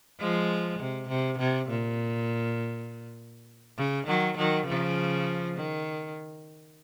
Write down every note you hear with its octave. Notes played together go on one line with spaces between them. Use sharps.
F3 G#3
C3
C3
C3
A#2
C#3
D#3 F#3
D#3 F#3
C#3 F3
D#3